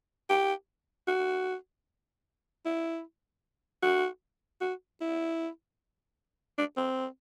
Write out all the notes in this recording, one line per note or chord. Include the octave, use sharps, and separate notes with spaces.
G4
F#4
E4
F#4
F#4
E4
D4
C4